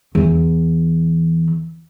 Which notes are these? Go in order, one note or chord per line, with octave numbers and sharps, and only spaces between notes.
E2 E3